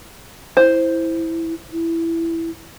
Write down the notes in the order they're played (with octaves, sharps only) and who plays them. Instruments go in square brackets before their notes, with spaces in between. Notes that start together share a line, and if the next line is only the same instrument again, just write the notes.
[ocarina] E4 [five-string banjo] C5
[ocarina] E4